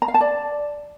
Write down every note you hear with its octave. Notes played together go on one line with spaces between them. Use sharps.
A#5
F5
A5
D5